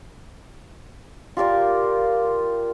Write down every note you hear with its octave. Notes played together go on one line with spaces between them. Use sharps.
F4 G4 A#4 D5